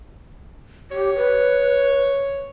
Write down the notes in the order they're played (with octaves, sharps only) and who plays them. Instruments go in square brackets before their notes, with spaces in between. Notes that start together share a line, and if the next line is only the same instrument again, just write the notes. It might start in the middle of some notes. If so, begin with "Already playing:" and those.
[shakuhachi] G4 [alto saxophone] C#5
[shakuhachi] B4